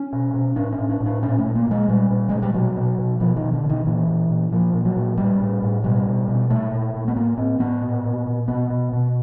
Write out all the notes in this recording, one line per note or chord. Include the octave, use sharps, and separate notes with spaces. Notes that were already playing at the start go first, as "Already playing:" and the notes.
Already playing: C#4
B2
B2
A2 D4
C#4
A2
D4
A2
D4
A#2 C#4
A3
A#2
A#3
A#2 G#3
A#2 G3
A#2
A#2 G#3
G3
B2 F#3
B2
B2
B2 F3
D#3
B2
D3
B2
D#3
A#2 E3
A#2
A#2
A#2 F3
A#2
F#3
A#2
A2 G3
A2
A2
B2 G3
B2
B2
A#2 A3
A#2
A#2
B3
A2 A#3
A2 C4
A2 B3
A#2
A#2
A#2
B2 B3
B2
B2